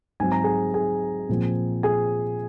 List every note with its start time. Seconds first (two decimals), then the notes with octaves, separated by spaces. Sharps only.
0.20 G#2 F#3 C4 G#5
0.32 A#5
0.44 G#4 G#5
0.74 G#4 G#5
1.29 A#2 F3 C4
1.83 G#4 G#5